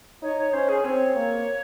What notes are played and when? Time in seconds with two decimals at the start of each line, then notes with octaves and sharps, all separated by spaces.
0.22 D#4 C#5
0.38 C#5
0.53 C#4 C5
0.69 G#4
0.84 C4 C#5
1.15 A#3